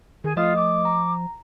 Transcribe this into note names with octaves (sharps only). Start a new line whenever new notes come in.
D#3 G#4
F3 A3 F4 D#5 D#6
D6
A#5